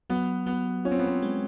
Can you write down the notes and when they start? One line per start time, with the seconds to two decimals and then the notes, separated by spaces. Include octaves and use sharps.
0.10 F#3 B3
0.46 F#3 B3
0.85 C#4 F4
0.91 C4
0.99 B3
1.07 C4
1.22 G#3